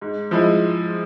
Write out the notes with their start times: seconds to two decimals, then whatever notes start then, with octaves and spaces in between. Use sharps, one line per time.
0.01 G#2
0.31 F3 G#3 E4